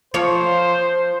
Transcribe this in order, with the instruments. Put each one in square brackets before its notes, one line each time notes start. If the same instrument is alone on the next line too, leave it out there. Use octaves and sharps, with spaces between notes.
[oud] F3 C#5 [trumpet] C5